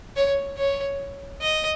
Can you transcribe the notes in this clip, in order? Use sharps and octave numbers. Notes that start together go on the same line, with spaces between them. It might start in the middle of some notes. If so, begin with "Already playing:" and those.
C#5
C#5
D#5